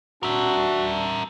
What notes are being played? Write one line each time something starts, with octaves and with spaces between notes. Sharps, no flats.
D4 F#4 A#4 E5